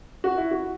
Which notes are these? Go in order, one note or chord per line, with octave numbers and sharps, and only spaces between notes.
F#4
E4
F#4